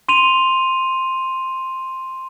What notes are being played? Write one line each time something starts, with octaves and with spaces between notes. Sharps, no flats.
C6 D#7 F7